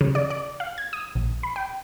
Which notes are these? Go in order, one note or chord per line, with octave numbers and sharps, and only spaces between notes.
C#3
D5
D5
F5
G#6
D#6
A#1
B5
G5